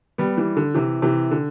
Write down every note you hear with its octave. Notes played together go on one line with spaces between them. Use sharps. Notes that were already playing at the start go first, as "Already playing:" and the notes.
G3 B3
E3 G3
D3
C3 E3
C3 E3
D3